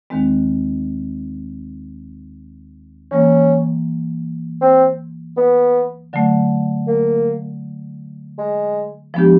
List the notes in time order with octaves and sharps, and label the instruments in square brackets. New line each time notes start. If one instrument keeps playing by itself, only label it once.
[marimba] D#2 D#3 G#3 C4
[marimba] E3 G3 A#3 [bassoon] C#4
[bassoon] C4
B3
[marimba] D3 F#3 A3
[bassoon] A#3
G#3
[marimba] F3 G#3 B3 D4 G4